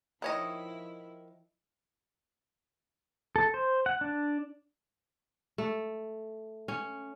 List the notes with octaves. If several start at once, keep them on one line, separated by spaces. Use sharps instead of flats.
D#3 F3 E4 C#5 D#5
A4
C5
F#5
D4
A3
C#4